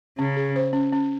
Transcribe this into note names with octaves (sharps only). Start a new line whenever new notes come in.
C#3 C#4
G#4
C5
C#4
C#4